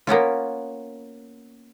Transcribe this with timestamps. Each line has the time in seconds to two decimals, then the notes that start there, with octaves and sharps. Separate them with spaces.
0.07 A#3 B3 C#4 F4